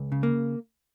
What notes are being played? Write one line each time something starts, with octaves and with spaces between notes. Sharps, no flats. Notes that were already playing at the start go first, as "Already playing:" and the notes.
Already playing: C#2
C#3
A#3